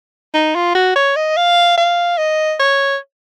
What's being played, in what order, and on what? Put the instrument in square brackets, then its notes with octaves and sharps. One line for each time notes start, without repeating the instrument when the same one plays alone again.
[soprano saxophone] D#4
F4
F#4
C#5
D#5
F5
F5
D#5
C#5